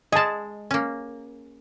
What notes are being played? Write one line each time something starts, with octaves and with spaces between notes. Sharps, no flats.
G#3 G#4 D#5 A5
A#3 C#4